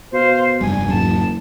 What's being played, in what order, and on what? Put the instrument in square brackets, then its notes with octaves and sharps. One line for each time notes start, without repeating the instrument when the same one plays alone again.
[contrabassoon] B2 [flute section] C5 F5
[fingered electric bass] F1 G2 G3 [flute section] G#5
[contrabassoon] F#1 [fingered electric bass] E2 G#2 F#3 [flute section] A5